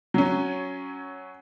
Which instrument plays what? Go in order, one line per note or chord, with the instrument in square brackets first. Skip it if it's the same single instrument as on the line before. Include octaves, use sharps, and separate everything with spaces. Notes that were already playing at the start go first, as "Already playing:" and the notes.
[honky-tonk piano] F#3 C#4